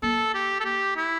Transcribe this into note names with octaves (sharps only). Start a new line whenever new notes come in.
A#3 A4
G4
A4
G4
E4